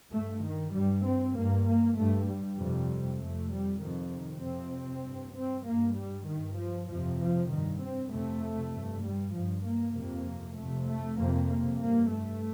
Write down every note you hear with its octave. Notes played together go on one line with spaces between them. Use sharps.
G2 A3
D#3
G2 G3
C4
G2 A#3
A#3
G2 A3
G3
F2 C3
F2 C3 A3
G3
F2 C3 D#3
D#3
F2 C3 C4
G2
C4
G2 A#3
G3
G2 D#3
F3
F2 C3 F3
F3
G2 D#3
C4
F2 C3 A3
G2
G3
G2 F3
A#3
F2 C3 A#3
F2 C3 A3
A3
F2 C3 A#3
A#3
G2 A#3
A3